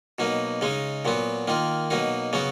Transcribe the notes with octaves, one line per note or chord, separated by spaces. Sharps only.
B2 F#3 A#3 D#4
C#3 G#3 D#4
A#2 F#3 B3
D#3 A#3 F4
B2 F#3 A#3 D#4
C#3 F#3 B3 F#4